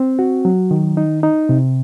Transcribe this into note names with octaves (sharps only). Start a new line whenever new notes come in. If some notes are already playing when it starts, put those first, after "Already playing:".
Already playing: C4
F#4
F#3
D#3
D#4
D#4
C3